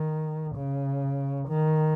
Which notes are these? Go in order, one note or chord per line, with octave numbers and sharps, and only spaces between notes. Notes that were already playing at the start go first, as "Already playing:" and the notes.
Already playing: D#3
C#3
D#3